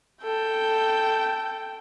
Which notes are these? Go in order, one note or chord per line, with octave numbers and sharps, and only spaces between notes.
A4 G5